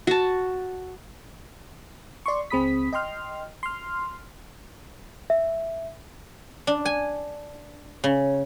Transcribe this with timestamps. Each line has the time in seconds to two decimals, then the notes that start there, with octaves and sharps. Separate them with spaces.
0.07 F#4 A5
2.26 D5 C6 C#6
2.50 C#2 C4 G#4 B5 D#6 B6
2.93 D#5 G5 C6 F6
3.63 C6 F6
5.30 E5
6.67 D4
6.85 G#5
8.04 C#3